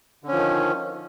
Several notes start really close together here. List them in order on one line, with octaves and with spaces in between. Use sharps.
D3 C#4 F3 D#3